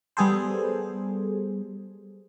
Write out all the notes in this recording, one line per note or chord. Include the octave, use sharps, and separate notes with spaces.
G3 B3 G#4 A4 C5